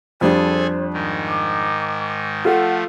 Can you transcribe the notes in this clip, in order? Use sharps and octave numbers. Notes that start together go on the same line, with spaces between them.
F2 G3 D4 G#4 A4 C5 G#5
G#2 D#3
D6
F3 A3 F4 A4 F#5